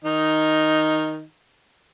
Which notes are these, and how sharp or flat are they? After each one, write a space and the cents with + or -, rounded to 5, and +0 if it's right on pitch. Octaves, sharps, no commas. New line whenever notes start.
D#3 +0 D#4 +0